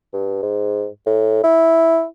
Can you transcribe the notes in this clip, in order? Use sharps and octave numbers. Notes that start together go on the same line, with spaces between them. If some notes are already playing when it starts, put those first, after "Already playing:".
G2
G#2
A2
E4